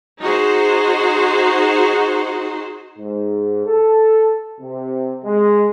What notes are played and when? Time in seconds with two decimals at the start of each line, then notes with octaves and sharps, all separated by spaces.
0.20 D#4 F#4 G#4 C5
2.99 G#2
3.65 A4
4.60 C3
5.24 G#3